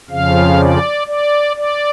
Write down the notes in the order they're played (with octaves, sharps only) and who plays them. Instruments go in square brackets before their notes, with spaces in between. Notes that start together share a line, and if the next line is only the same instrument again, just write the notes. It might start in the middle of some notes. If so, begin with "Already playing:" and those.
[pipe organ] F2 C#3 F3 F5
D5
D5
D5